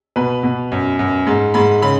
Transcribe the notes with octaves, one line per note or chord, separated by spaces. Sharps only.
B2 B4
B2
F#2
F#2
G#2
G#2 B5
C#3 B5